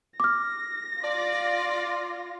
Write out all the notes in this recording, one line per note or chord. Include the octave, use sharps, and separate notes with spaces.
D6 F6 A#6
F4 D5